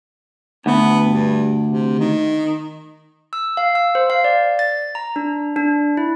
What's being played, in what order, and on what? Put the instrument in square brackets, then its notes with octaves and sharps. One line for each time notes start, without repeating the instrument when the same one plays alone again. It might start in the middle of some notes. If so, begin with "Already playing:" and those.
[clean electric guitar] D2 [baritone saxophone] B3
[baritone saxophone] G2
C3
D#3
[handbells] E6
F5
E6
C5
F5
D5
A6
A#5
D4
D4
E4